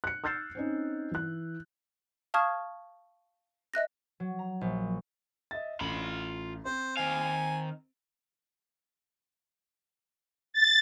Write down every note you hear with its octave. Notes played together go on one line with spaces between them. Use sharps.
F#6 C#7
E6 F6 G6 A6 C7 E7
C4 C#4 D#4
E3 F#6
F5 A5 C#6 D#6 F6 G#6
D#5 E5 F#6 A#6
F#3
A#5
A#1
D#5 E5 A6
A1 F4 B5
C4 C5
D#3 F5 G#5
A6